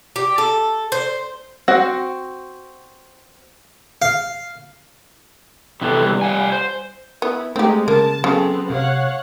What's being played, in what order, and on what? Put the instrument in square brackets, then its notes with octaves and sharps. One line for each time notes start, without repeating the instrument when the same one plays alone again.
[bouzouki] G4
A4
C5
[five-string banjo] C4 F#4 F#5
[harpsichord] F5
[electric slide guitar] C3 E3 B3 [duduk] A4
[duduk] G3
[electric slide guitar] F5 F#5 G#5
C5
[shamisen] B3 [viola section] E4
[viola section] G#3 D#4 [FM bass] A3 [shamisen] C4 G4
[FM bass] C#3 [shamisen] A#3 [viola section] A5
[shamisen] C#3 [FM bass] F#3 [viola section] B3 C4 A4
[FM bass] C3 [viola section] C#5 F5 F#5